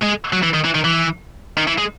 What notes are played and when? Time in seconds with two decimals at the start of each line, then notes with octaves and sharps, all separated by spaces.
0.02 G#3
0.33 F#3
0.43 E3
0.54 D#3
0.65 E3
0.75 D#3
0.84 E3
1.58 D#3
1.67 E3
1.78 G#3